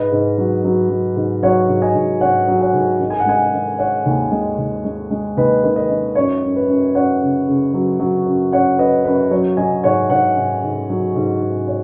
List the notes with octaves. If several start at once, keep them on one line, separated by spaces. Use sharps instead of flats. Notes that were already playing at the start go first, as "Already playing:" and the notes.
Already playing: G#2 B4 D#5
G#2
F#3
F#3
F#3
G#2
F#3 C#5 F#5
G#2
D#5 G#5
G#2
G#2 C#5 F#5
F#3
C#5 F#5
G#2
D#3
G#5
F#5
G#3 D#5 G#5
D#3
D#3 C#5 F#5
D#2
G#3
D#2
G#3
G#3
D#2 B4 D#5
D#3
B4 D#5
D#3
F#2 C#5
F#2
B4
F#2
F#2 C#5 F#5
C#3
C#3
F#3
F#3
F#2
F#2 C#5 F#5
F#2 B4 D#5
F#2 B4
F#3 C#5
F#3 D#5 G#5
G#2 C#5 F#5
G#2 C#5 F#5
G#2
G#2
F#3
G#2
G#2
C#5